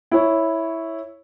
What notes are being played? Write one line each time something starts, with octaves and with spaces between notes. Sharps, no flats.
E4 C#5